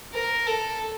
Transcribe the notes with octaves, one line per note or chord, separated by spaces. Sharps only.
A#4
A4